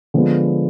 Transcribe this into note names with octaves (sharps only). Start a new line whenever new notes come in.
D3 F3 G#3 B3